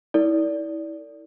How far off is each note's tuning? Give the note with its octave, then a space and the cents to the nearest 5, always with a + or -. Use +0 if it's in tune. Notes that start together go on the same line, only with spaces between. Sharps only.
E4 -35 A4 +45 D5 -20